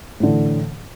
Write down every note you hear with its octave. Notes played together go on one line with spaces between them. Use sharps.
A2 D3 E3